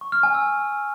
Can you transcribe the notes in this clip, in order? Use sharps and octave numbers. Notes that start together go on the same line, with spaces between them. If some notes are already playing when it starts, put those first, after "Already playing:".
C#6
F6
G#5
E6